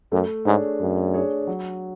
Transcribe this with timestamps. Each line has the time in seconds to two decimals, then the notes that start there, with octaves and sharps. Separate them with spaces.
0.12 F#2 A3
0.45 G#2 D4 G#4 C#5
0.80 F#2 A3
1.14 D4 G#4 C#5
1.47 F#3